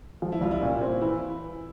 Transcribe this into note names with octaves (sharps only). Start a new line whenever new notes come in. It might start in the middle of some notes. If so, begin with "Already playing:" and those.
F3
E4
C2 F4
E4
A#2 C#4
C4
E3 E4